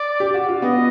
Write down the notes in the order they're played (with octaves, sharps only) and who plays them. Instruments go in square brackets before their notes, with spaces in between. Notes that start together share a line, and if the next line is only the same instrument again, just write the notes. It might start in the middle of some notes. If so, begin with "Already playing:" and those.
Already playing: [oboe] D5
[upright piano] G4
F#4
F4
[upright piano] B3 [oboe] D#5